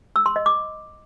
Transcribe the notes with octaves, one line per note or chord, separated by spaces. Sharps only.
E6
C6
D#5
D6